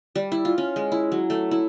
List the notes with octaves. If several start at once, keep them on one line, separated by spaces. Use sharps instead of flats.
G3
E4
F4
C#4
G#3
E4
F#3
A3
E4